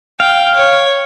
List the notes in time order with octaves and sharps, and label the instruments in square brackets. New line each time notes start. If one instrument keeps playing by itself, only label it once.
[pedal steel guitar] F5 [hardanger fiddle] G5
[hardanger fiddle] C#5